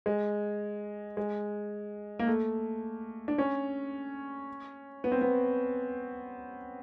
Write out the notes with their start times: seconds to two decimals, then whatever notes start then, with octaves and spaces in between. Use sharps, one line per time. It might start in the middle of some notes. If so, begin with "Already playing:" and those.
0.06 G#3
1.17 G#3
2.19 A#3
2.27 A3
3.28 D4
3.38 C#4
5.04 B3
5.12 C4
5.21 B3